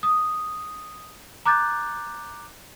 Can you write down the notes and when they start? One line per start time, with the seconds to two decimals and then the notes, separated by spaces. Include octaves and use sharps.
0.03 D#6
1.45 A#5 D6 F#6 G6 A6